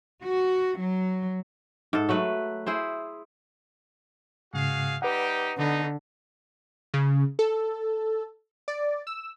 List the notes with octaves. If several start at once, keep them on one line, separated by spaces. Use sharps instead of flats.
F#4
F#3
G#2 A4
F#3 A3 B4
E4 G#4 C5
G#2 C#3 F#4 G#4 F5
G3 D#4 G4 B4 F#5
D3 B3 D#4
C#3
A4
D5
E6